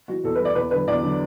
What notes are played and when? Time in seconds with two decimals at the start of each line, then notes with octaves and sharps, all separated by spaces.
0.08 E3 F#4
0.24 E2 A4
0.35 B4
0.40 E3 D5
0.55 E2 B4
0.71 D3 F#3 B4
0.88 E2 D5
1.03 D3 F#3